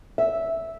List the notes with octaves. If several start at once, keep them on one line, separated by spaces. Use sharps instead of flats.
E5